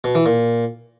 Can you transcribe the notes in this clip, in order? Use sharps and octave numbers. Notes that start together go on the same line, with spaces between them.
B2
E3
A#2